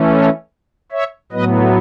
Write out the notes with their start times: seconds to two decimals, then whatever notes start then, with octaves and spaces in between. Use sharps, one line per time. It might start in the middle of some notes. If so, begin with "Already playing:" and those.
Already playing: E3 A3 C#4
0.13 A4 C#5
0.92 C#5 E5
1.32 A2 F#3 B3 B4 D#5